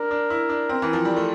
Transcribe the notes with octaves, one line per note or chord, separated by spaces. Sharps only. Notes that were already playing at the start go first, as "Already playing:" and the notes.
Already playing: D4 A#4
D4
E4
D4
C4
E3
F3
G3
A3